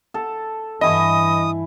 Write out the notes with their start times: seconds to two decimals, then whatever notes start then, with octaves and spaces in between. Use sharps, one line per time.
0.14 A4
0.81 G2 E3 E4 D#5 G#5 C#6 D#6